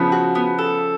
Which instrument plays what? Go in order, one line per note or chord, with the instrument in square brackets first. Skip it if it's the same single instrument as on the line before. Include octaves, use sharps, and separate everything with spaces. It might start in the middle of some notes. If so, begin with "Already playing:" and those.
Already playing: [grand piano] C#3 F3 [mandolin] B3
[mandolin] F#4
B3
A4